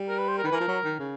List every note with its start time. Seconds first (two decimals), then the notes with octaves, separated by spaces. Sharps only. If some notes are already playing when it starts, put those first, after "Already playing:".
Already playing: G3
0.09 A#4
0.19 B4
0.28 C5
0.38 A#4
0.44 D#3 B4
0.51 E3
0.55 A#4
0.60 F3
0.68 F#3
0.84 D#3
0.99 C#3